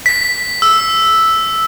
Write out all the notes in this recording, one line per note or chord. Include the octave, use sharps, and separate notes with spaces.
B6
E6